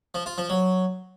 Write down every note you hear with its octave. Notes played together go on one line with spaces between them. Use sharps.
F3
F4
F3
F#3